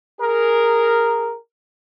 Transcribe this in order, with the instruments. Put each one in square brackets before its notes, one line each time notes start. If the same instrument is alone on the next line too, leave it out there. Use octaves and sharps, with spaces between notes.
[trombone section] G#4 A#4